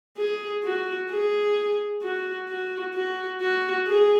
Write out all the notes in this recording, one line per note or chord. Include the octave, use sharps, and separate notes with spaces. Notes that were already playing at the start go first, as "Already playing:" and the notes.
G#4
F#4
G#4
F#4
F#4
F#4
F#4
G#4